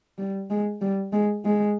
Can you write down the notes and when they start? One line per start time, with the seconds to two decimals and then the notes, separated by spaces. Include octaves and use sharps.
0.18 G3
0.50 G#3
0.82 G3
1.13 G#3
1.45 G#3